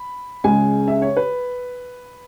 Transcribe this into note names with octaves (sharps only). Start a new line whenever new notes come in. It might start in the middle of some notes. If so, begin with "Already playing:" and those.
Already playing: B5
C#2 C#3 G#3 G#5
E5
C#5
B4